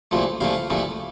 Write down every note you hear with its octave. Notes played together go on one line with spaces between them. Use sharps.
C2 A#2 F3 A3
C2 A#2 F3 A3 F5
C2 A#2 F3 A3